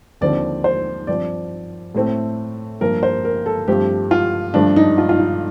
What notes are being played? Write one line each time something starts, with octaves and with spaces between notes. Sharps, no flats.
D#2 D3 F3 C4 D5
C5
G2 F3 C4 D5
A2 A3 C4
G2 F3 A#3 A#4
C5
A#4
A4
G2 F3 A3 C4 G4
F4
G2 F3 A3 D4
D#4
F4
F4
D#4